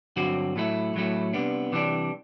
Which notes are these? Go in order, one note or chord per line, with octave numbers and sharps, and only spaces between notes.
G2 D3 F#3 C4 F#4
A2 F#3 A3 E4
A2 F#3 A3 E4
C3 E3 G3 B3 D4
C3 E3 G3 B3 D4